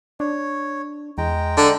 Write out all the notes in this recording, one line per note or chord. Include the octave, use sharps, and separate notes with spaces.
D4 C#5
E2 G#3 G5 A#5
D3